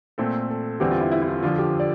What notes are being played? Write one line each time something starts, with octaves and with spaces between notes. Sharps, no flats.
A#2 A3 C4 A4
A4
E2 D3 G3 C4 G4
F4
E4
E4
E4
F4
E4
F2 D3 F3 F4
G4
D5